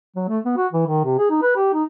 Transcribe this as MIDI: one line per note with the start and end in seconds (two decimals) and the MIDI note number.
0.16 0.25 54
0.28 0.39 57
0.45 0.54 59
0.57 0.67 66
0.72 0.85 52
0.87 1.03 51
1.05 1.17 48
1.18 1.29 68
1.30 1.39 63
1.42 1.54 71
1.56 1.72 67
1.73 1.84 63